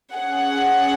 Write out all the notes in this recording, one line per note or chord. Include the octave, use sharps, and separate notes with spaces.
C#4 G#4 F#5